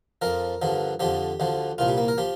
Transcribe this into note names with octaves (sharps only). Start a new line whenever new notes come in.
F2 F3 A#4
G2 D3 F3
F2 D3 F3 G4
D2 D3 F3
C2 A#2 F3 F4
G3
A#3
A#4
F3 G4